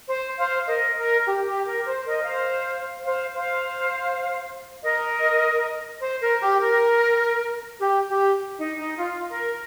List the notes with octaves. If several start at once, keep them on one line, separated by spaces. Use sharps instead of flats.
C5
C5 F5
A#4 D#5
A#4
G4
G4
A#4
C5
A#4 D#5
C5 F5
C5 F5
C5 F5
A#4 D#5
C5
A#4
G4
A#4
G4
G4
D#4
D#4
F4
A#4